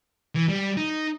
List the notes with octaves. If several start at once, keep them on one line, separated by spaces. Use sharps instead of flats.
E3
G3
D#4